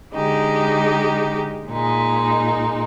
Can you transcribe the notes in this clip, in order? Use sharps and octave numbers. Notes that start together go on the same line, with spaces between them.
D3 G#3 D#4 G4
A#2 G#3 D#4